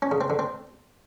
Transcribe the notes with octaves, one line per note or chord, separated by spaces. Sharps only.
C#4
C#3
C4
D3
C4